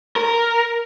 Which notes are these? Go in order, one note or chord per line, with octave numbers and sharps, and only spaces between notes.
A#4